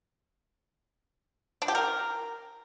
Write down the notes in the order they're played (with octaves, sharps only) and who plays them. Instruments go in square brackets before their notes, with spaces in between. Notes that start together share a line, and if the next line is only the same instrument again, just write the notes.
[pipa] D4
G4
A#4